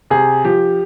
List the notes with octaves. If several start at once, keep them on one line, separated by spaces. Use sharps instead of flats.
C3 G#4
F3 G4